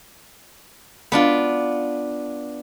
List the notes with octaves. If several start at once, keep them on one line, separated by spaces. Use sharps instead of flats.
B3 D4 F4